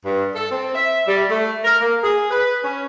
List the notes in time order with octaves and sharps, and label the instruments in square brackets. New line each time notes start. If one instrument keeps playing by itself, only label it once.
[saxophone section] G2
A4
C4
E5
G3
A3
A#4
A#3
G#4
B4
C#4